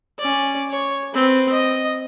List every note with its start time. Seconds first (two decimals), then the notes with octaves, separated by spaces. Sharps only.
0.19 C#4 D5
0.70 C#5
1.14 C4 B4
1.52 D#5